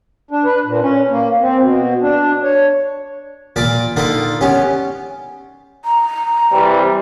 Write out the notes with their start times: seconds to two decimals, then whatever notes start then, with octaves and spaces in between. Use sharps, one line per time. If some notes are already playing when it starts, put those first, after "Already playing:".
0.31 D4
0.45 B4
0.65 A#2
0.81 C#4
1.09 A#3
1.40 C4
1.60 B2
2.02 D4
2.44 C#5
3.56 A#2 A#4 D5 A5 B5
3.96 D3 D#4 F4 A#4 A5 B5
4.41 B3 C#4 G4
5.85 A#5
6.52 C3 E3 G3